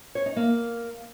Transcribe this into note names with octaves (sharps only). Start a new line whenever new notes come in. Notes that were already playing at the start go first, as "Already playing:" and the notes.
C#5
D#4
A#3